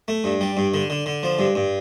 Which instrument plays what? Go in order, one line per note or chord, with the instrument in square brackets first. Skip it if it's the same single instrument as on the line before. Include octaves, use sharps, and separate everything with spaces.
[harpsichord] A3
G2
G3
G2
D3
D3
D3
F3
G2
G2